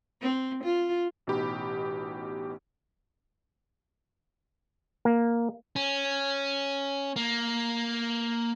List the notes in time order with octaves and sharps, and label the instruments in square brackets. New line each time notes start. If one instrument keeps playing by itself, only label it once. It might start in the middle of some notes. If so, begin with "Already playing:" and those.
[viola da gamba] C4
F4
[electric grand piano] A1 B2 D#4 G4 B5
[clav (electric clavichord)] A#3
[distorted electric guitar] C#4
A#3